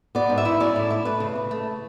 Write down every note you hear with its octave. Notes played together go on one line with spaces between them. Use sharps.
B3 D5
G#2
E5
E4
C#4 D5
A2
E4
A3 B4
C#3
C#3
A3